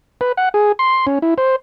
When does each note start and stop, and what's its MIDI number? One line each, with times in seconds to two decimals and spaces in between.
0.21 0.32 71
0.37 0.49 78
0.54 0.72 68
0.79 1.06 84
1.07 1.19 61
1.22 1.34 64
1.38 1.56 72